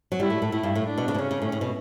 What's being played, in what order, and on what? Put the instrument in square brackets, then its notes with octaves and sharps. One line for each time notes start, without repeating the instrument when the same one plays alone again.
[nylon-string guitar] F#3
[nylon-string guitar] G3 [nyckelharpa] E4
[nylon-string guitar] A2
A2
[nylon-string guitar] A2 [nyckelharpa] E4
[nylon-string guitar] G2
A2
[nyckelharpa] D4
[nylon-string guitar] B2
C#3
B2
[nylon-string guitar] C#3 [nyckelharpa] C#4
[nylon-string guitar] C#3
A2
A2
B2